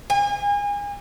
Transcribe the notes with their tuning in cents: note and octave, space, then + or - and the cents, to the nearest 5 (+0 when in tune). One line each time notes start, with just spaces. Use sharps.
G#5 -35